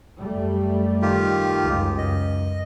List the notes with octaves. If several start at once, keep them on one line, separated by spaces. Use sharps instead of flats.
F#2 G3 A3
D#3 F4 G4
C#2 F#2
D#5